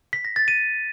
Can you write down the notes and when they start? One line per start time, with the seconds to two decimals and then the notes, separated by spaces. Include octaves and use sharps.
0.13 B6
0.25 A#6
0.36 A6
0.48 D#7